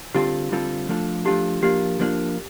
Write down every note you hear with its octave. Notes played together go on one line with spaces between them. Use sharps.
D3 G3 C4 F4 G4 A4
D3 G3 C4 F4 A4
F3 A3 D4 F4 A4
F3 A3 D4 F4 G4 A4
F3 A#3 D4 F4 G4
F3 A#3 D4 F4